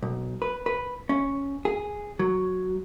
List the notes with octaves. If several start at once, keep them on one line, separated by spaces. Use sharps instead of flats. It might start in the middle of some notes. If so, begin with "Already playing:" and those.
B1
B4
B4
C#4
G#4
F#3